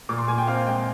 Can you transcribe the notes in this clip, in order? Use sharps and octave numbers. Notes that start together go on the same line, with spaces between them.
A#2 D6
C6
A#2 G#5
G5
C4 F5
G#3 G5